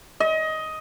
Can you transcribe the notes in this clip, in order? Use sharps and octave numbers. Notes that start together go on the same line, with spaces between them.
D#5